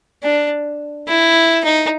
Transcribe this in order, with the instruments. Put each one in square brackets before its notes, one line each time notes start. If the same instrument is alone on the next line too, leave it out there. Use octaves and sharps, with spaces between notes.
[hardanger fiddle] D4
E4
D#4